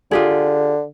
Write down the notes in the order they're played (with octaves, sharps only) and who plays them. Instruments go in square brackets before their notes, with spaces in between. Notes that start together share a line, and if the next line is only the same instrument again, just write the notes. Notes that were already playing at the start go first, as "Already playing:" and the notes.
[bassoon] D3 [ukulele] F4 G4 G#4